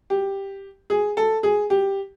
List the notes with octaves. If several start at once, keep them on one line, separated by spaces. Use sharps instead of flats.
G4
G#4
A4
G#4
G4